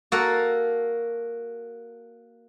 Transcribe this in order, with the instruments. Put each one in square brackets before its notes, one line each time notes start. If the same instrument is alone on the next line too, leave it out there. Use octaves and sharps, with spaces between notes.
[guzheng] A#3 F#4 A4 A#4